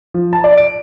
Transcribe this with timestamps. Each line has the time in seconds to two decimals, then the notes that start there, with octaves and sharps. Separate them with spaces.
0.14 F3
0.33 A5
0.44 D5
0.58 D7